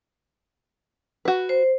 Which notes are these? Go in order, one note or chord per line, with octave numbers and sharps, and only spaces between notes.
F#4 B4
C5